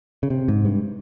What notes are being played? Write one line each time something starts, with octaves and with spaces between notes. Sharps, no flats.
C#3
C3
G#2
G2